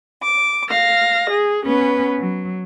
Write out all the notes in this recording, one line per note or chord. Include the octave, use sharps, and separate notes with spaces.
D6
F5 A#6
G#4
B3 C#4 B4
F#3